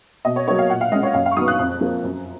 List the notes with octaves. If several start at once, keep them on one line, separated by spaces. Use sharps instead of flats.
B2 D#5
C#5
F#3 A#3 C#5
F5
A#2 F#5
F5
G#3 C#4 D#5
C#5
F#2 F5
F5
C#6
D#3 F#3 B3 D#6
F#6
F2
F3 A#3
F#2